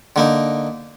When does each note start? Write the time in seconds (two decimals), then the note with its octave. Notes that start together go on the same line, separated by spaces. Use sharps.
0.16 D3 A#3 D#4